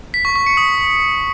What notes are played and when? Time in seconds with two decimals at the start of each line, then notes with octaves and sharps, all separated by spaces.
0.14 B6
0.25 C#6
0.36 C#6
0.46 C#7
0.57 D#6